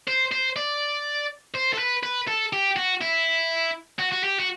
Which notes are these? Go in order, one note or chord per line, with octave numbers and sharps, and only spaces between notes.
C5
C5
D5
C5
A4
B4
B4
A4
G4
F#4
E4
F#4
F#4
G4
F#4